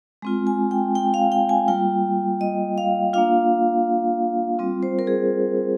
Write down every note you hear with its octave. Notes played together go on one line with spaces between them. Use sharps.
G#3 C4 F4
G#5
G5
G5
F5
G5
G#5
G3 A#3 F4 G5
D#5
F5
A#3 D4 F4 F5
G3 C4 F4
C5
A#4
G#4